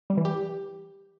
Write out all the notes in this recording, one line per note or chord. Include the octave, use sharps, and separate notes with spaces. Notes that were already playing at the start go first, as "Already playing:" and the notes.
G3
E3
G4